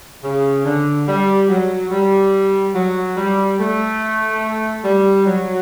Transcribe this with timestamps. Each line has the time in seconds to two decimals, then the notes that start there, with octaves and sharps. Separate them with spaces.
0.24 C#3
0.65 D3
1.08 G3
1.49 F#3
1.91 G3
2.75 F#3
3.17 G3
3.59 A3
4.85 G3
5.26 F#3